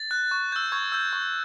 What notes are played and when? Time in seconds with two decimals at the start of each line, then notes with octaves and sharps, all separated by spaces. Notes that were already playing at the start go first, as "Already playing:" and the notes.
Already playing: A6
0.11 F#6
0.31 C#6
0.52 E6 G6
0.72 C#6 G#6
0.92 E6 G6
1.13 C#6